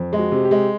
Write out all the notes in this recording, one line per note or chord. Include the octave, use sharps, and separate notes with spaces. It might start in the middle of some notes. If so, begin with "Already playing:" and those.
Already playing: F2
G#3
F#4
C3
G4
G#3